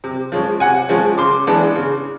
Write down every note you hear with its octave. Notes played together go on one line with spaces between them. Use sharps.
C3
F3 G#3 C#4
C3 F#5 G#5
F3 G#3 C#4
C#3 C6 D6
E3 G#3 B3 D4
C#3